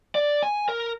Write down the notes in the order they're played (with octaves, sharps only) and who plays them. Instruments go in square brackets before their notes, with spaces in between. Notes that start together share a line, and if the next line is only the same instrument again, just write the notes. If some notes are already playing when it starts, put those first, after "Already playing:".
[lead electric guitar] D5
G#5
A#4